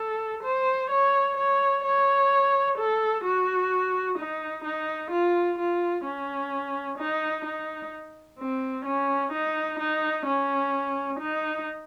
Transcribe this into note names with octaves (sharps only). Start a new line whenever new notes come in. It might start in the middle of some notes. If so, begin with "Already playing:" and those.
Already playing: A4
C5
C#5
C#5
C#5
A4
F#4
D#4
D#4
F4
F4
C#4
D#4
D#4
C4
C#4
D#4
D#4
C#4
D#4